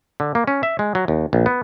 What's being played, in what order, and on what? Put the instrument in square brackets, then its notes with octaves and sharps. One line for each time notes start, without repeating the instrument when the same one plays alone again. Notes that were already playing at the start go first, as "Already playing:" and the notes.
[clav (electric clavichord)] D3
A#3
C#4
E5
G#3
F#3
D#2
A#1
B3